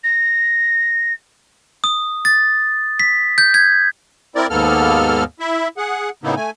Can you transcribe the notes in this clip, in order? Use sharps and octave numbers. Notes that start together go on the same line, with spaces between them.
A#6
D#6
A6
B6
G6
G#6
C4 E4 A#4 D5
D#2 G#2 A#3 B3 A4 F6
E4 E5
G#4 F#5
A2 C#3 A#3 B3 D#4 E4
A3 G#5